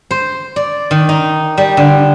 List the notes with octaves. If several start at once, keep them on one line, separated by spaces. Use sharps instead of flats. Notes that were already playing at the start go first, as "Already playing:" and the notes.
C5
D5
D#3
D#4
G3
D3